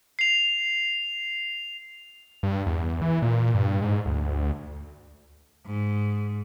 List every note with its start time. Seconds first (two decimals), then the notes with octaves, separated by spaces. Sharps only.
0.19 C7 F7
2.43 G2
2.66 E2
3.01 E3
3.22 A#2
3.55 G2
3.82 G#2
4.06 D2
5.66 G#2